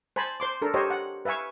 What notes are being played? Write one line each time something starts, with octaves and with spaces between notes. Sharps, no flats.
C5 G#5 A5 B5
C5 C6 D6
D4 A4 A#4
G4 C5 C#5 D#5
F#5
B4 E5 F5 G#5 C#6